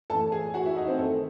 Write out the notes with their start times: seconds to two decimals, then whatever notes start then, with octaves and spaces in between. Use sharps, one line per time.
0.10 A2 A4 A5
0.13 E3
0.32 G#4 G#5
0.54 F#4 F#5
0.65 E4 E5
0.76 D#4 D#5
0.88 C4 C5
0.99 C3 D#3 A3 A4